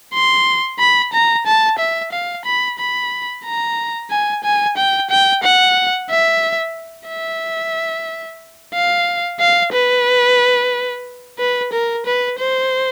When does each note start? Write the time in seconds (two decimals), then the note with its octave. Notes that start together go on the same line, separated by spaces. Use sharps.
0.14 C6
0.79 B5
1.13 A#5
1.47 A5
1.79 E5
2.12 F5
2.45 B5
2.79 B5
3.45 A#5
4.11 G#5
4.44 G#5
4.77 G5
5.10 G5
5.43 F#5
6.10 E5
7.08 E5
8.75 F5
9.40 F5
9.73 B4
11.39 B4
11.73 A#4
12.06 B4
12.39 C5